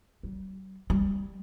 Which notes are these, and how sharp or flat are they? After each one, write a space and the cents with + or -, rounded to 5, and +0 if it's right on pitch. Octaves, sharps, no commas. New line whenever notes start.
G3 -45
G3 +10